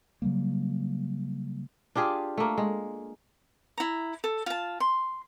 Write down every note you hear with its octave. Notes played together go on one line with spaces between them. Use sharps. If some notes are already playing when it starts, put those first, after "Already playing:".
C#3 F#3 G3 A#3
D4 F4 G4 G#4
A3 A#3
G#3
E4 A#5
A4
F4 A5
C6